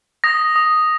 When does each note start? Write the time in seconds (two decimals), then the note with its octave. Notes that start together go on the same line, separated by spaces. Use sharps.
0.24 D#6 A#6
0.56 D#6